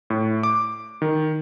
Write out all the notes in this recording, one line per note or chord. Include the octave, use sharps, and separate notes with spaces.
A2
D6
D#3